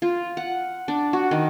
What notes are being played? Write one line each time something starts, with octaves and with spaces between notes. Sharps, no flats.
F4
F#5
D4
F#4
D#3